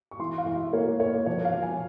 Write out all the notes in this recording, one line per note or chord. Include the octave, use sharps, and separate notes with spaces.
C#6
E3 C6
F5
E3
E5
A#3 C#5
A#3 C#5
F3 C#5
F5
F3
G#5